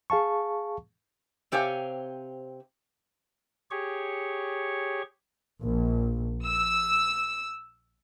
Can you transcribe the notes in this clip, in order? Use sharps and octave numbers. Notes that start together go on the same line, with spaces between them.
G#4 F5 A5 C#6
C3 C4 G4 C#5 F5 G#5
G4 G#4 C#5 C#6
A#1
E6